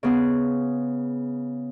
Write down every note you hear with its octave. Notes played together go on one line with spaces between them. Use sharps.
C#3 B3 G#4